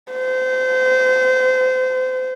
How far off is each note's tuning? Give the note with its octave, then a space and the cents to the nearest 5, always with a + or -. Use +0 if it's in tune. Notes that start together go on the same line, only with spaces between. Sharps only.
C5 -30